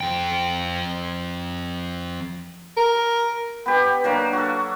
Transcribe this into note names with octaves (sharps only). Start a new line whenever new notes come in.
F2 G5
A#4
B3 G4
F#3 A#3 D4
F#4 A4